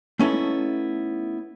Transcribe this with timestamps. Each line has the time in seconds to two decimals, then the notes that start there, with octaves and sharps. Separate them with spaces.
0.19 A3 B3 C#4 D#4 E4 A4